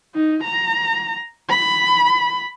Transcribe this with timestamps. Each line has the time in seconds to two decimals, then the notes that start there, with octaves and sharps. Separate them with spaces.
0.15 D#4
0.43 A#5
1.49 B5